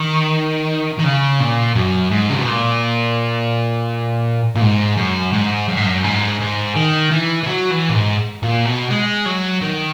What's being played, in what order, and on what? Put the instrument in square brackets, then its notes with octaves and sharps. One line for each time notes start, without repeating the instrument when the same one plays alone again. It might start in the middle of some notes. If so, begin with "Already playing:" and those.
Already playing: [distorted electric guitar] D#3
D#3
C#3
A#2
F#2
G#2
C#3
B2
A#2
A#2
G#2
F#2
G#2
F#2
G#2
F#2
G#2
G#2
D#3
E3
E3
F#3
E3
A#2
G#2
A#2
B2
G#3
F#3
D#3